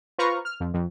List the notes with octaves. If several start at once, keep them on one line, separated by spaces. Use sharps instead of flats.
F4 B4 C5 A#5 C#6 F6
F6
F2
F2